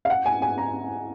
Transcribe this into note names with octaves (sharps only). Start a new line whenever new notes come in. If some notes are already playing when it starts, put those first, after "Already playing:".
F5
F#5
G#5
G#5
A#5